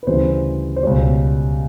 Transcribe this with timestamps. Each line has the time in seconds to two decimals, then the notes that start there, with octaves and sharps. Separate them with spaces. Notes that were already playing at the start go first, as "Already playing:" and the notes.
0.03 B4
0.07 D2 C#3 E3 G3 C5
0.76 C5
0.83 C#2 B2 G3 C#5